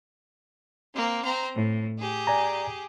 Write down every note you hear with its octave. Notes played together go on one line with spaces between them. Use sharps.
A#3 C4
C4 A#5
A2
G4 G#4
D5 G#5 A#5